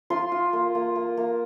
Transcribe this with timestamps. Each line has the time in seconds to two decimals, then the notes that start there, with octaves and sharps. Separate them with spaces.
0.10 F4 C6
0.32 F4
0.53 A#3
0.75 A#3
0.96 A#3
1.17 A#3